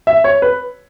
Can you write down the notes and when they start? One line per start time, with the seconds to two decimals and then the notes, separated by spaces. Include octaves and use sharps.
0.07 E5
0.24 C#5
0.42 B4